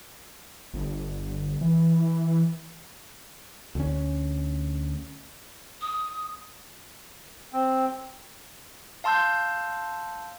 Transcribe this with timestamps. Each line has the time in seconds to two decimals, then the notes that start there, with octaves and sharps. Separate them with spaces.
0.74 G1
1.61 E3
3.75 D2 C#4
5.81 D#6
7.53 C4
9.04 F5 A5 C6 E6 G6